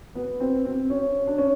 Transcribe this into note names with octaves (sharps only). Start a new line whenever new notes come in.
B3
C4
C4
C#4
D4
C#4